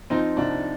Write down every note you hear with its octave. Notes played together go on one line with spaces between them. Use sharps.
F3 C4 D#4
C2 D4